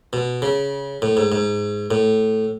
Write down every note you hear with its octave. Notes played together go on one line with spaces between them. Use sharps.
B2
C#3
A2
G#2
G#2
A2